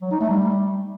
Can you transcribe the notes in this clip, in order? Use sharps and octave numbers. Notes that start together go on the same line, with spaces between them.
F#3
D#4
A3
G3